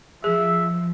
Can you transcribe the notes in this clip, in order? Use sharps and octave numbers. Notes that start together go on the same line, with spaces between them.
F3 G#4 E5